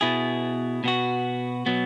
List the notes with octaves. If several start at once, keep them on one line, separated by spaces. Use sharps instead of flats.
B2 B3 E4 G#4
B2 B3 F#4
B2 F#3 B3